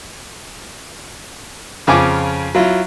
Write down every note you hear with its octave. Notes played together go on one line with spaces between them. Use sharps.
F2 C#3 C4 F4 G#5 D6
F#3 E4 F4